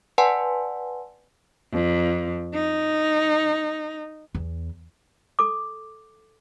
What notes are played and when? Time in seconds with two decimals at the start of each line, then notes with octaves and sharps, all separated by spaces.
0.18 B4 D5 F#5 G#5 A5 C6
1.73 F2
2.55 D#4
4.35 E2
5.39 A4 D6